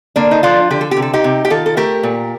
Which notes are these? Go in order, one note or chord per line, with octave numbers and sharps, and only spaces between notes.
D3 A#3 D4
D#4
F3 D4 F4
D3 G4
A4
G4
C3
A4
D#4 G4
C3
G4
D#3 F4 A4
A4
A3 G4 A#4
A#2